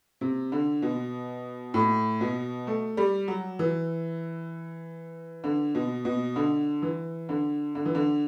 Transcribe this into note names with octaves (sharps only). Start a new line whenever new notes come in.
C3
D3
B2
A2
B2
A3
G3
F#3
E3
D3
B2
B2
D3
E3
D3
D3
E3
D3